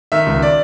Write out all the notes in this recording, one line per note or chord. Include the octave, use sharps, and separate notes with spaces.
D#3 E5
C#2
D5